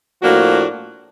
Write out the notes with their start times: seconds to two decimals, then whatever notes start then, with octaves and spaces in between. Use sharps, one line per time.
0.23 A2 F3 A#3 D4 F#4